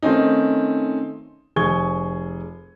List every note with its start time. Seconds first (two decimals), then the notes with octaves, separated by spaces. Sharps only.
0.02 D#3 A3 C4 C#4 D#4
1.56 F1 G#4 C#6 G#6 G7